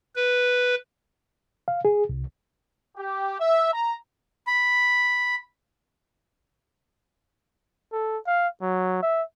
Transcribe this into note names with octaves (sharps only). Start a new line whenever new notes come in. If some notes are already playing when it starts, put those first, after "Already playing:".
B4
F5
G#4
C2
G4
E5
A#5
B5
A4
F5
F#3
E5